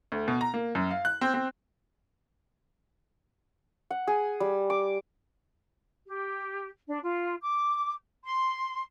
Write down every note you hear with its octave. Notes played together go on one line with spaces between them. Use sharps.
D2
B2
A#5
A#3
F#2
F5
F#6
C4
C4
F#5
G#4
G3
D6
G4
D4
F4
D6
C6